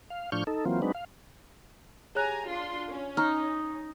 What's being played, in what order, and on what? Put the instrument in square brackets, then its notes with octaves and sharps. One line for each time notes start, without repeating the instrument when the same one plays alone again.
[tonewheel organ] F5
A2 F3 D4 C#6 F6 G6
D#4 A4
E3 F#3 A#3 C4 F4
F#3 G#3 C4 D4 D#4 B4
F5
[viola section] G4 G#5 A#5 [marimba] G#4 C#5 F#6
[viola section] D4 F4 C6
C#4
[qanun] D#4 [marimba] A#5 C#6 F6